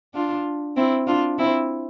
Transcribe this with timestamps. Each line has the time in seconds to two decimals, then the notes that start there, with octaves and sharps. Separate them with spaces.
0.14 D4 F4
0.76 C4 E4
1.07 D4 F4
1.39 C4 E4